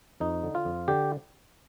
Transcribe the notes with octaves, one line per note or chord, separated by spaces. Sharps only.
F2 D#4
D3
F4
F2
D3 G4